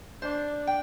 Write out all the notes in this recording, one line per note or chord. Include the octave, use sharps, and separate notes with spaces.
D4 C5
G5